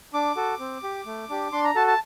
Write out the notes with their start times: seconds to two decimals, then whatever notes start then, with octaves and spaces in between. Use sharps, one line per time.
0.14 D4 D6
0.36 F#4 A4
0.59 C4
0.83 G4
1.06 A3
1.30 D4 G4
1.52 D4 C6
1.64 A#5
1.75 F#4 A4 A5
1.87 A5